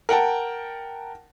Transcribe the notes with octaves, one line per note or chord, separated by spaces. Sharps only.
A#4 F#5 G5 A5